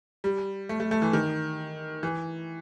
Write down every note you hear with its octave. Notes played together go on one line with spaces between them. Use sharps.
G3
A3
A3
A3
E3
D#3
E3